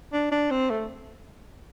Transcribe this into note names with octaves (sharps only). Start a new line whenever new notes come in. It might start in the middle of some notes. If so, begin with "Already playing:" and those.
D4
D4
C4
A3